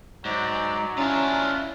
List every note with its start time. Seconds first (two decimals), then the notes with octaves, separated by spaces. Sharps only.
0.25 G#2 F#3 D5
0.98 C#4 D4 E4 F4